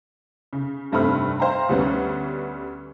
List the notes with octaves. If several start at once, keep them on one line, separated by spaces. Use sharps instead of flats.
C#3
F1 G2 A3 C4 B5 F6
C5 F5 G5 A#5
D2 G3 B3 C#4